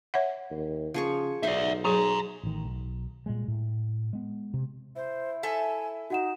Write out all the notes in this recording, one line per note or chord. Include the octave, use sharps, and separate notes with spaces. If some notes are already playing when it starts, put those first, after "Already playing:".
C#5 E5 F#5
D#2
C#3 F3 G#4 C#6
B1 D#4 C5 D5 E5
F#3 G#4 G#5 A#5
A1 D#3
B1
A#2 G3 G#3
A2
G#3 B3
C3
E4 C5
A4 E5 G#5
D#4 F#4 F#5 E7